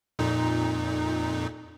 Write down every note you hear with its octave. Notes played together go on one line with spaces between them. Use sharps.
F2 A#2 D#4